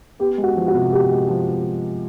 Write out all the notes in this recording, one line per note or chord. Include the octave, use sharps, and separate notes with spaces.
B3 G4
G#3
F#4
F3
F#4
C3
B3 G4
G#3
F3